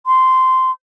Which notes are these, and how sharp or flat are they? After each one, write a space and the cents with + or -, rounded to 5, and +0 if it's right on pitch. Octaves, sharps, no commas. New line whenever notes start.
C6 -10